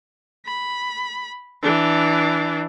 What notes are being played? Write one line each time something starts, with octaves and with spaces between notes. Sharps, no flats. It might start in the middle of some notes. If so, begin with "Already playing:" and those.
B5
E3 D4